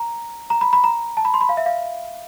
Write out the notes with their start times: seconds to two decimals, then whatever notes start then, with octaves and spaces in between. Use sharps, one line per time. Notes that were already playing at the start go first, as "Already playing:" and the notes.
Already playing: A#5
0.50 A#5
0.61 B5
0.73 B5
0.84 A#5
1.17 A5
1.25 B5
1.34 C6
1.41 B5
1.49 F5
1.57 E5
1.66 F5